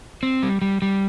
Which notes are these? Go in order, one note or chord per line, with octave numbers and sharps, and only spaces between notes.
C4
G3
G3
G3